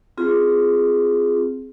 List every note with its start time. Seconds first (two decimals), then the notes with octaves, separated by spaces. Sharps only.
0.18 C4 F4 G#4